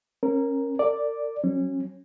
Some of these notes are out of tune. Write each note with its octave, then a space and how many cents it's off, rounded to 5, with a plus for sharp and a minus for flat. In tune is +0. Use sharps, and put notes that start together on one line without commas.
C#4 -25 A#4 +0
A#4 -40 D5 +0
F#3 +0 C#4 -25